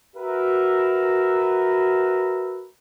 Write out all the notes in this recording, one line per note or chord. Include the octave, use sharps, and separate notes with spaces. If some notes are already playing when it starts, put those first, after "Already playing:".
F#4 A#4 B4 E5